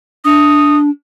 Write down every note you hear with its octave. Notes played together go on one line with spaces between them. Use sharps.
D4 D#6